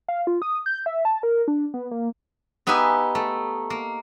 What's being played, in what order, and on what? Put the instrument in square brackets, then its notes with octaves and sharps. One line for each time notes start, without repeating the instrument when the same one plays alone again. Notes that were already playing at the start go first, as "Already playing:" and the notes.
[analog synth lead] F5
F4
D#6
G6
E5
A5
A#4
D4
B3
A#3
[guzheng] B3 D#4 G4 B4 E5 G#5
A3
A#3